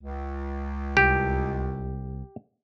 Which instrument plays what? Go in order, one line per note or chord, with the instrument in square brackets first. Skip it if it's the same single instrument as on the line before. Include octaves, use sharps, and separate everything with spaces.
[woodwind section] C#2
[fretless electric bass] C2 [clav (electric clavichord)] G4